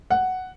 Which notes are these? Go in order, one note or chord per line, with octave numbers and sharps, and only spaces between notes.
F#5